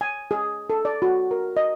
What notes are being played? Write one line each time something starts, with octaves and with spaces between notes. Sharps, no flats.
G#5
G#4
A4
D5
F#4
A#4
D#5